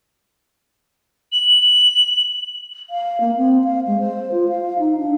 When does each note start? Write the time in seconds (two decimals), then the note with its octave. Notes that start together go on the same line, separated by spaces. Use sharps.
1.32 F#7
2.90 F5
3.20 A#3
3.37 C4
3.64 F5
3.87 G#3
4.00 C5
4.32 F4
4.49 F5
4.79 D#4
4.97 D4